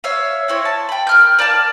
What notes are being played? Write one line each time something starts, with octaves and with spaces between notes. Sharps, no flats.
C#5 E5 F5
C4 E4 C#5
A5
G5 B5
A#4 F6 G6
A#4 D5 F5 A5